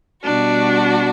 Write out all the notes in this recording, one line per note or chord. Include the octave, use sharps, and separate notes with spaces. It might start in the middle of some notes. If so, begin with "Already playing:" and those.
B2 G3 D4 F#4